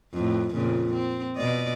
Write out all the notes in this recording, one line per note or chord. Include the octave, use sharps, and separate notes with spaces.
F2 A2
F2 A#2 C#3
C4
B2 D5 D#5